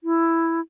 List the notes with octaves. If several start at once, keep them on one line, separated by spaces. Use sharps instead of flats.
E4